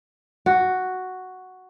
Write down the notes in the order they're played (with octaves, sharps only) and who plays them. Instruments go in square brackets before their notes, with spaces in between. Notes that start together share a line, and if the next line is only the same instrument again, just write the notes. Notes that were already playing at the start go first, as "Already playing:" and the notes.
[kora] F#4